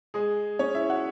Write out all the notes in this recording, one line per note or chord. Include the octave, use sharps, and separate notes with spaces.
G#3 G#4
C#4 C#5
E4 E5
F#4 F#5